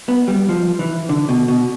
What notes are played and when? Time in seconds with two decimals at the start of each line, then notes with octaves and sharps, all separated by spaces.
0.09 B3
0.28 G3
0.49 F3
0.79 E3
1.09 D3
1.29 B2
1.48 B2